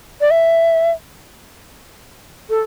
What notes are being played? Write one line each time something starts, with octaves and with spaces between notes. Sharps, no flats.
D5
E5
A4